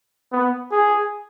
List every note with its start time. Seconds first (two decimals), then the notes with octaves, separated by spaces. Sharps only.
0.32 B3
0.72 G#4